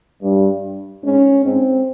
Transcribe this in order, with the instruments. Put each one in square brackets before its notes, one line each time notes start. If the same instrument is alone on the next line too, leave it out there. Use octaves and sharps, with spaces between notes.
[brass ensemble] G2
[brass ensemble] G#2 [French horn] C#4
[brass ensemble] G#2 [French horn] C4